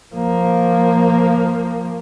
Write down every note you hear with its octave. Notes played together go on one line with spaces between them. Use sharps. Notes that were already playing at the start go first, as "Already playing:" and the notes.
F3 A#3